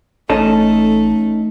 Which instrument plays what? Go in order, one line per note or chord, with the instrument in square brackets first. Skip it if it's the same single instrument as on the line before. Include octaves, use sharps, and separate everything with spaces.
[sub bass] A1 [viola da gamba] A3 [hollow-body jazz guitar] C#4 D#4 A4